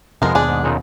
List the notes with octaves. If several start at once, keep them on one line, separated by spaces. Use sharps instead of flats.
F2 C3 F3 G#3 B3 A#4
D#2 B2 D4 G#4
G#2
A#2 C#3 D#4